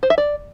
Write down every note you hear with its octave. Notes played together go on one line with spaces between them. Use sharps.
C5
E5
D5